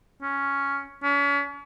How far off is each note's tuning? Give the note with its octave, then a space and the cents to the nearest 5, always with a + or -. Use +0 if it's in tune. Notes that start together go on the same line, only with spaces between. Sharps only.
C#4 +5
C#4 +40